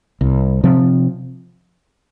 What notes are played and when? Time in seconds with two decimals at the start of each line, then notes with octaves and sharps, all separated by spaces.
0.21 C2
0.64 C3 F3 C4